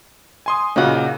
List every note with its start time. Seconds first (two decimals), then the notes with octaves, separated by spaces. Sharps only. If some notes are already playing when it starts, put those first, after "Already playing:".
0.46 G#5 C6 D#6
0.76 A#2 C#3 A#3 D#4 F#4